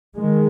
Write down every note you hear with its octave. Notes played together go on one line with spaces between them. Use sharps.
D#3 G#3